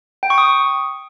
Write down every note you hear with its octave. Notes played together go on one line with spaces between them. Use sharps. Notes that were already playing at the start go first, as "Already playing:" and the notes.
G5
C#6
D#6